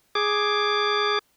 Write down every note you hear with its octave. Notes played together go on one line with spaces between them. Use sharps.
G#4 D6